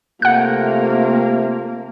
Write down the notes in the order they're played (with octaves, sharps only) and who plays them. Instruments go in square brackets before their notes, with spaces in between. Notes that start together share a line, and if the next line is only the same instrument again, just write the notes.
[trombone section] C3 A3 F4 [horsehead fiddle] A#3 [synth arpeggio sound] F#5 F#6